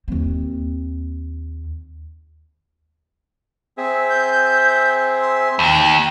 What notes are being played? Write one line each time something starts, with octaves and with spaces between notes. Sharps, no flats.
D#2 C4
C4 G#4 E5
G6
C6
D#2 G5